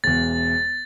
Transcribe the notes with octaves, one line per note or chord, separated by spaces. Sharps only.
E1 E2 A6